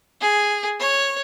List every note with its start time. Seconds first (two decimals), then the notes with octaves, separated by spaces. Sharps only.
0.21 G#4
0.80 C#5